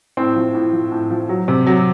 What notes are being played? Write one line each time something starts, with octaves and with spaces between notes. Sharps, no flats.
A2 C4
F3
A2
F3
A2
F3
F#3
C3
F#3